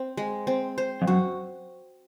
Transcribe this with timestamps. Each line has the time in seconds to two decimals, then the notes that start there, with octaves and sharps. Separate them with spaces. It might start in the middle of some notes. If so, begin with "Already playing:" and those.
Already playing: C4
0.17 G#3
0.47 C4
0.78 C5
1.02 F2
1.07 F#2 F#4